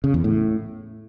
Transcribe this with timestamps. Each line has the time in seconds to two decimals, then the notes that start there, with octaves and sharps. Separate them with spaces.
0.04 C#3
0.14 E2
0.24 A2